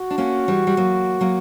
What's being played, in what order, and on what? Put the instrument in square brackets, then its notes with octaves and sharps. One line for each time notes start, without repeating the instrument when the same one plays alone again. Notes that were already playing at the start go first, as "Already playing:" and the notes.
Already playing: [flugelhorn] F#4
[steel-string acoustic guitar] D4
A#3 C#4
E3 G3
G3
F#3 A#3
F#3 A#3